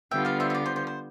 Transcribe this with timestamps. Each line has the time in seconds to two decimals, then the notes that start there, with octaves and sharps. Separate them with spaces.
0.11 D3 G3 B3 F4 E5 G5
0.25 D5 F5
0.40 C5 E5
0.50 E5
0.55 D5
0.66 C5
0.76 C5
0.87 C5